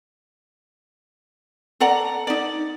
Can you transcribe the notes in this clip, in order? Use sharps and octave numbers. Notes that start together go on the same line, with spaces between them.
A4 D5 F#5 A#5
D#4 D5